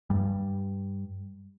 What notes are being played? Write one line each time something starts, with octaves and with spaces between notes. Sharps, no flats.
G2 G3